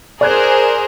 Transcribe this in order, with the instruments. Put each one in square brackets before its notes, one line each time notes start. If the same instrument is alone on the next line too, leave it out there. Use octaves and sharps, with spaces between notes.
[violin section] G#4 A#4 C5 [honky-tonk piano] D5 F#6 G#6